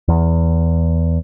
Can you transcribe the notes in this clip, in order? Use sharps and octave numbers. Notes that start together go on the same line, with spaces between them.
E2